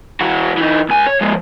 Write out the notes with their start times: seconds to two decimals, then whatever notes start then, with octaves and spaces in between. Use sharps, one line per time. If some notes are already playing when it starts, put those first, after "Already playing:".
0.21 E3 F#4
0.57 E3 D#4
0.89 C#2 G#5
1.07 C#5
1.21 F3 G#3